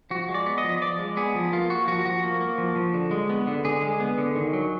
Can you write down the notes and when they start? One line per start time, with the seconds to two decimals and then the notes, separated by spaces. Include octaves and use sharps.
0.10 F3 F#4
0.29 G#3
0.34 D5
0.46 B3
0.58 D#5
0.64 F3
0.81 F3 D5
0.99 G#3
1.17 B3 G#4
1.35 F3
1.53 A#3 F4
1.70 A#3 F#4
1.88 F3 F#4
2.05 F3 F#4
2.24 A#3
2.40 A#3
2.58 F3
2.76 F3
2.94 D3
3.11 G#3
3.29 B3
3.47 D3
3.64 D3 G#4
3.82 G#3
4.00 B3
4.18 D3
4.35 D#3
4.53 F#3